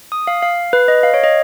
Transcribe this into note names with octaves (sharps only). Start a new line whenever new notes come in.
D#6
F5
F5
B4
D#5
F5
C#5
D#5